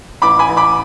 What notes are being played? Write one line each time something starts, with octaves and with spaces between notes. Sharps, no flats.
A1 B5 D6
G#5 B5
A1
B5 D6